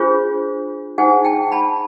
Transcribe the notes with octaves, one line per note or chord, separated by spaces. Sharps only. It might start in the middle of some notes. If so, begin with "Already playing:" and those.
Already playing: D4 F4 G#4 C5
D#4 G#4 C5 F#5 G#5
G5 A5
A5 B5